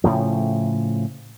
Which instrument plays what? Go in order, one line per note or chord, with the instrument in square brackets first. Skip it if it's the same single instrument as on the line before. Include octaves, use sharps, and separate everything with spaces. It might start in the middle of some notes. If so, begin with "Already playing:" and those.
[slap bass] A2 C#3 F3